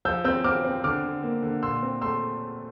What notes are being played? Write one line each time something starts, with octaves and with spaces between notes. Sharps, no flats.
F3 E6 G6
C4 E6 G6
C4 D6 F6
C4
D3 D6 F6
D3
A#3
D3
A#2 C6 E6
C4
A3 C6 E6